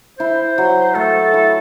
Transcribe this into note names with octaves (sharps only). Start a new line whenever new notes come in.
E4 C5
F#3
A3 A4
E4